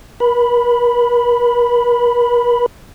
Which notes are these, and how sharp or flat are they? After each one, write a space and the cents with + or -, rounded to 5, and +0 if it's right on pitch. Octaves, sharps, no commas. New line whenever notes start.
A#4 +45 B5 +0